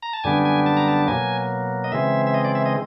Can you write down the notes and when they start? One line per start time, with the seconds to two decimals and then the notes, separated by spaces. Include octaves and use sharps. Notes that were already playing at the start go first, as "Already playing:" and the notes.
0.03 A#5
0.13 A5
0.24 F#2 D3 G3 B3 D4 G#5
0.45 G#5
0.66 A5
0.77 A#5
0.88 A5
1.08 B2 F#3 A#3 G#5
1.84 D#5
1.92 C#3 E3 G#3 C4 E5
2.27 E5
2.34 D#5
2.45 D5
2.55 E5
2.66 D#5